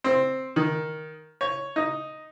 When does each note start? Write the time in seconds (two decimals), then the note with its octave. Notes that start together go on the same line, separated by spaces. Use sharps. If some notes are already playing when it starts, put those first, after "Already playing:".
0.04 C4
0.56 D#3
1.41 C#5
1.76 D#4